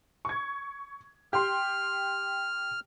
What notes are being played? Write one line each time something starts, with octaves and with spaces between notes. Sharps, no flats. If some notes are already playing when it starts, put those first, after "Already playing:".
C#6 G#6
G4 C6 F6